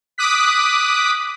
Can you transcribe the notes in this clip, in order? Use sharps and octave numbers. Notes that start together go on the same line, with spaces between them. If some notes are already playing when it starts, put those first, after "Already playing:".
D6 D#6 F#6 B6